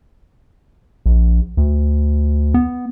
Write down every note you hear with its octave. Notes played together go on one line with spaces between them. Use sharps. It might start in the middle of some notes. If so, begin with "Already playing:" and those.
A#1
D2
B3